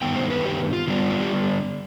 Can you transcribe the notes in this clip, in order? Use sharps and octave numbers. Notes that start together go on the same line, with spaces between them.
G2 D#3 B3 G5
C5
B4
G4
F4
D3 G3 B3 D4 F4
F4
G4